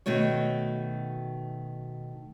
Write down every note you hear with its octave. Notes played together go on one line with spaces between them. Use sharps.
B2 D#3 A3 F#4 C#5